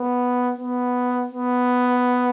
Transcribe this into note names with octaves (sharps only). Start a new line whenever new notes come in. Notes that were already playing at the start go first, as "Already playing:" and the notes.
Already playing: B3
B3
B3